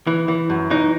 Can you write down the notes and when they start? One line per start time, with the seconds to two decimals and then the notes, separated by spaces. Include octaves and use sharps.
0.07 E3
0.28 E3
0.50 F#2
0.70 E3 D#4